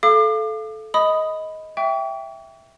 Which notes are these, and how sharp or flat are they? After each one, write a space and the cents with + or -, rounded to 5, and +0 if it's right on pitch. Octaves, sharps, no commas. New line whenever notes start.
A4 -15 F5 -25 D6 +35
D#5 +15 B5 +10 D#6 +0
E5 +5 G5 +0 C#6 +45